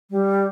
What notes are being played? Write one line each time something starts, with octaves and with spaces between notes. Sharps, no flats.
G3